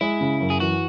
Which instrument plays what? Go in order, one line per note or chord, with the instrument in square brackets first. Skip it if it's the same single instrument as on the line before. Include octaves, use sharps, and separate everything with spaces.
[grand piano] G#3 [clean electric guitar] E4
[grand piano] C#3
F#2
[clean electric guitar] G#4
[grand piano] E3 [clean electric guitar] F#4